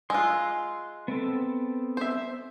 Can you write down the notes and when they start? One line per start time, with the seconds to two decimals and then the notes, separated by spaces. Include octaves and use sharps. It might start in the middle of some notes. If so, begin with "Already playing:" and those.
0.10 G#3 F4 C6 E6 F#6
1.08 B3 C4 A4
1.97 C5 E5